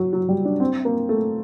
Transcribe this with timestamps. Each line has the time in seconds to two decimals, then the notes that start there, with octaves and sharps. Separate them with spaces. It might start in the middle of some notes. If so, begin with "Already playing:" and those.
Already playing: F#3
0.13 F#3
0.29 G3
0.45 D4
0.60 C4
0.85 A#3
1.09 A3